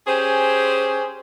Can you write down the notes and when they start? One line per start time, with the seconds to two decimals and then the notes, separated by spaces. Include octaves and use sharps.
0.07 C#4 G4 G#4 C5